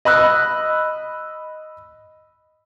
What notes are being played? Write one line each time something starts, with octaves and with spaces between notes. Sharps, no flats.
D#5 B5 E6 F#6